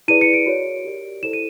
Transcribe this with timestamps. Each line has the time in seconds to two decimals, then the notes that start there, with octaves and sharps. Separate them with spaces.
0.08 E4 G#4 B4 D5 D#7
0.21 C#7
0.34 D7
0.46 F#4 A#4 C#5
0.85 G4 A#4 D5
1.22 E4 A4 C5 E7
1.33 D#7